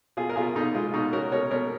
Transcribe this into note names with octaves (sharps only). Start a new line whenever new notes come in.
B2 F4 G#4
A#4
B2 F4 G#4
B2 D#4
G#3 F4
B2 D#4 F#4
C#4 F#4 A#4
B2 A#4 C#5
B2 A#4 C#5